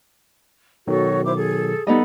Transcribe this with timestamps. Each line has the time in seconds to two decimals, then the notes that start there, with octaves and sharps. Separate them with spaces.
0.88 B2 D#3 F#3 F#4 A4 C#5
1.24 E4 C5 D6
1.37 G#4 A4
1.87 G3 B3 D#4 A4 D#5 B5